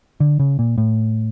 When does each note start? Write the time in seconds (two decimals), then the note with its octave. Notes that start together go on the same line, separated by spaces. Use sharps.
0.20 D3
0.40 C#3
0.59 A#2
0.78 A2